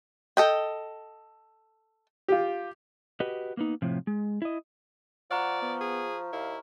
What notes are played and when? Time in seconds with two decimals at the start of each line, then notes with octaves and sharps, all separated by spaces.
0.37 A4 D#5 G5
2.28 F4 G4
3.20 F#4 G4 B4 D#5
3.57 A#3 B3 D#4
3.82 A2 C3 F3
4.07 G#3
4.42 E4 D#5
5.31 F3 D5 F#5 A#5 C#6 F6
5.62 B3
5.81 G#4
6.33 D#2 E4 F5